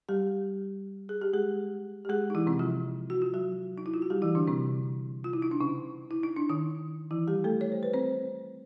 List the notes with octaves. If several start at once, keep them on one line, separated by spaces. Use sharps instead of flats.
G3 G4
G#4
G4
G#3 G#4
G4
G#3 G#4
D#4
E3 E4
C3 C4
F3 F4
F#4
F4
F#3 F#4
D#4
E4
F4
F#4
G3 G4
E3 E4
D3 D4
C3 C4
F4
E4
D#4
D4
C#3 C#4
E4
D#4
D4
D#3 D#4
E3 E4
G3 G4
A3 A4
C#5
C5
B4
C4 C5